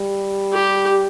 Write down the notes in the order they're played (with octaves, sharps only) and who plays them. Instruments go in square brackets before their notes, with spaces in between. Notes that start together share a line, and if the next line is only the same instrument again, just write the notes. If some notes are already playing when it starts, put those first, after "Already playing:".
Already playing: [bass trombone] G3
[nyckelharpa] G4